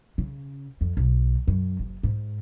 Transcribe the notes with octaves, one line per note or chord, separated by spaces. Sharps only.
C#3
F2
B1
F#2
F#1
G#2